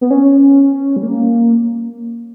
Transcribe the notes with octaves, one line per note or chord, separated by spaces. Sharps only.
B3
C#4
G3
A#3